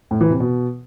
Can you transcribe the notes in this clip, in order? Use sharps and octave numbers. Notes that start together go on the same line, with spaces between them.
A2
E3
C3
B2